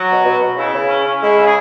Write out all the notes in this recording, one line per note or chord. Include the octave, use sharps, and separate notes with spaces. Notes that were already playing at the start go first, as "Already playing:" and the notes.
Already playing: F#3 F#4
B2
B2
B2
C#3 E4
C#3
C#4
C#4
G#3 E4
C#3
G#4